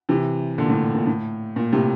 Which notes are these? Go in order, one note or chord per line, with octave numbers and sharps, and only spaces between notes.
C3 E3
A#2 D3
A2
A#2
A2
A#2
A2 C3